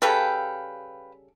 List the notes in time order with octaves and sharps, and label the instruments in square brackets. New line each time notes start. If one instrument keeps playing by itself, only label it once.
[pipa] C#3 G3 A4 [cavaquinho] B4 F5 G5